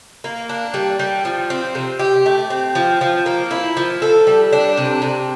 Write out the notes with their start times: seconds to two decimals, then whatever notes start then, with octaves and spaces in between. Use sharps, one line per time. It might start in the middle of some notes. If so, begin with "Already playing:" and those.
0.24 A#3
0.49 D4
0.74 G3
0.99 G3
1.25 F3
1.50 C4
1.75 C3
1.99 G4
2.26 A3
2.50 C4
2.75 F3
3.01 F3
3.26 A#3
3.51 E4
3.77 F3
4.02 A4
4.27 G3
4.53 D4
4.77 C3
5.02 C3